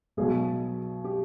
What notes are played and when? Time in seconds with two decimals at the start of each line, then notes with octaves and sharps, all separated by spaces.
0.17 B1 B2 F#3 G#4
1.04 G4